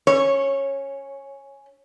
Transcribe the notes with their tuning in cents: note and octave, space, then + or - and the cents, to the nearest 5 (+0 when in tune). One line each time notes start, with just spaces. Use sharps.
C#4 +0 C#5 -15